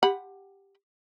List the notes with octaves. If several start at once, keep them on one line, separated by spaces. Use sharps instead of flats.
G4 F#5 B5